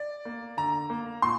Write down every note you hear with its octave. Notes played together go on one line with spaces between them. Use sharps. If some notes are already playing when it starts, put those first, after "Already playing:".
Already playing: D5
A#3
D3 A#5
A#3
A#2 C6